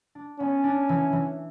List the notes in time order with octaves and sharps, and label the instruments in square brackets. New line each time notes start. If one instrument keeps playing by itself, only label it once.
[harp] D4
[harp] B3 [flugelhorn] C#4
[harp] D4
E3
E3